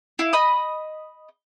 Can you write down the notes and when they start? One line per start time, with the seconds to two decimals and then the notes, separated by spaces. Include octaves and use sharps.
0.19 E4 F5
0.33 D#5 B5 D#6